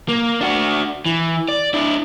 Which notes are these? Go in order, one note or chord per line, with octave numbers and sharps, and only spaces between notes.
A#3
D4 F#4
E3
D5
D4 E4